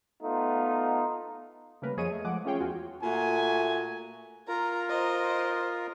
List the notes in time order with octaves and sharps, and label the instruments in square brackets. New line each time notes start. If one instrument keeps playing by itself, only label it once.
[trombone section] A3 B3 D#4 F4
[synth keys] C#3 G3 A3 A#3 A#4 B4
F2 F3 G#4 C#5 D#5 D#7
A3
F3 G#3 A3 F#5 D6
A3 C#4 F4 G#4 C#5 G5
E2 F4 F#4 F#5 G#5
[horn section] A#2 A3 F#4 G#5
[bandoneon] F4 A#4 [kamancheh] A#5
[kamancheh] C5 D#5